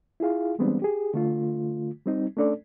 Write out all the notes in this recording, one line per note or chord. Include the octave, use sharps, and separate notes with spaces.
E4 F4 G#4 F5
E3 G3 G#3 B3 C4 D4
G4 G#4
D3 A3 F4
G3 C4 D#4
A3 C#4 D4 A4 D5